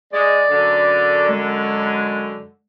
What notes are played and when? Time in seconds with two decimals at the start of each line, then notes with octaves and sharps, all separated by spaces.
0.13 G#3 D5
0.51 F#2 D3
1.29 G#3